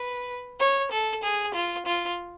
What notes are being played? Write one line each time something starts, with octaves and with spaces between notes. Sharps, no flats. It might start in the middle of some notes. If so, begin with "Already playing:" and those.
Already playing: B4
C#5
A4
G#4
F4
F4